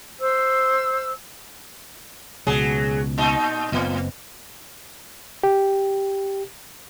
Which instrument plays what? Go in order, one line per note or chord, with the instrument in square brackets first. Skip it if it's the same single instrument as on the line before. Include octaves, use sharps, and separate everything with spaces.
[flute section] C5 E6
[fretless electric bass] C#2 B2 [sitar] F#3 G#4
[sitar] A#2 D#4
[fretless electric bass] F#1 B3 C4 [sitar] A2
[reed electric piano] G4